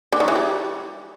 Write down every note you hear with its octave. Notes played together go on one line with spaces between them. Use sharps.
D3
D#3
E3
G3